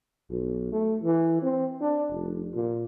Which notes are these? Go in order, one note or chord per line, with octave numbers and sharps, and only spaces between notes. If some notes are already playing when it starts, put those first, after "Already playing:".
B1
A3
E3
C4
D4
F1
A#2